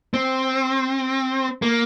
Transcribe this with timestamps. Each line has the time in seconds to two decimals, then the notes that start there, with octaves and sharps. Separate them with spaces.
0.14 C4
1.62 A#3